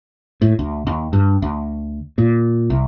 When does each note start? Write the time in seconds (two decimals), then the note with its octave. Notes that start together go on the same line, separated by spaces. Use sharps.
0.42 A2
0.59 D2
0.87 D#2
1.13 G2
1.42 D2
2.18 A#2
2.70 C2